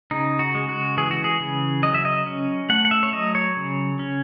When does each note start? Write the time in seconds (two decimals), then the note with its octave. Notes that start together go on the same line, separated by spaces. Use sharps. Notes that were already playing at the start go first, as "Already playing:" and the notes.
0.11 C#3 D#4
0.39 F#4
0.55 G#3
0.69 F#4
0.97 E3 G#4
1.11 F#4
1.24 G#4
1.40 C#3
1.83 F#3 D#5
1.94 E5
2.05 D#5
2.26 C#4
2.69 A3 F#5
2.85 F#5
2.91 E5
3.03 C#5
3.13 F#3 D#5
3.35 C#5
3.56 C#3
3.99 C#4